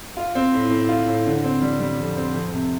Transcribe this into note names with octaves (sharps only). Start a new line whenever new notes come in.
F4
C4
A2
A2
F4
A2
D3
C4
G3
G3
F2
C4
F2
C3